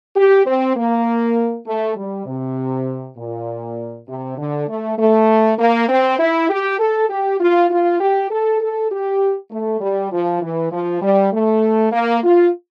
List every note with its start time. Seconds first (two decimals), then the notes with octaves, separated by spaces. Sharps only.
0.16 G4
0.46 C4
0.76 A#3
1.66 A3
1.97 G3
2.26 C3
3.17 A#2
4.08 C3
4.38 D3
4.68 A3
4.99 A3
5.59 A#3
5.89 C4
6.19 E4
6.50 G4
6.79 A4
7.10 G4
7.40 F4
7.71 F4
8.00 G4
8.30 A4
8.61 A4
8.91 G4
9.51 A3
9.81 G3
10.12 F3
10.42 E3
10.72 F3
11.02 G3
11.33 A3
11.92 A#3
12.23 F4